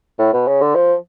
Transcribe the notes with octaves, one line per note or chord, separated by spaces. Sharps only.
A2
B2
C#3
D3
F3